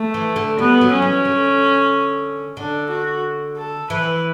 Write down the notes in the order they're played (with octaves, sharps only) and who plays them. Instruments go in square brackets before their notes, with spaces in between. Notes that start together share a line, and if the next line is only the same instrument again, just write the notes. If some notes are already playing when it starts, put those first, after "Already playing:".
Already playing: [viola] A3
[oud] E3
D3
[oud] G3 [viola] B3
[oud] F#3
[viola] C#4
[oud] E3
D3
[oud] D3 [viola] D4
[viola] F#4
A4
[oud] E3 [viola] B4